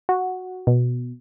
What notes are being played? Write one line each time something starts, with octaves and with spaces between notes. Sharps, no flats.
F#4
B2